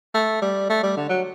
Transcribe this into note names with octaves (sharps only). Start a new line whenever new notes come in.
A3
G3
A3
G3
D3
F#3